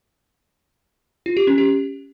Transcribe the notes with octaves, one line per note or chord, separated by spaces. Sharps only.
F4
G4
C#4
G4